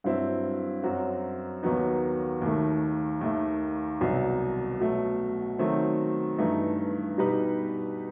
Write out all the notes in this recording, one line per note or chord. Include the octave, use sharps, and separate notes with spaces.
G2 F#3 C4 E4
F#2 F#3 C4 F#4
D#2 D#3 F#3 B3 D#4
D#2 D#3 A3
D#2 D#3 A3
C2 B2 F#3
B2 F#3 A3
D#3 F#3 A3 C4
G2 E3 A3 D#4
B2 G3 D#4 G4 B4